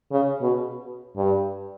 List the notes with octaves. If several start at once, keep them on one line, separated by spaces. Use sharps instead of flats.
C#3
B2
G2